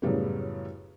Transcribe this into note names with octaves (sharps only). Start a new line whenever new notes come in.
F#2 A2 C#3 G3 B3